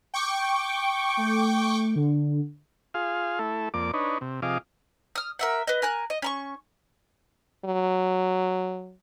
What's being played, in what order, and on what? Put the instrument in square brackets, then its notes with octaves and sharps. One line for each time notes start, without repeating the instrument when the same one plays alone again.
[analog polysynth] G5 C#6 D6
[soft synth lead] A3
D3
[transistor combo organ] F4 G#4 F5
A3 E4 A4
F2 A#3 D5 D6
D4 D#4 B4 C#5
C3
C3 F3 G#4 D#5 F5 D6
[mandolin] D#6 F6
A#4 E5 F#5
B4 D#5
A#4 G#5 F#6
D#5
C#4 B5 C#6
[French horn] F#3